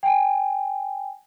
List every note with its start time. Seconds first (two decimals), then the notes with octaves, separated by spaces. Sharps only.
0.03 G5 G#5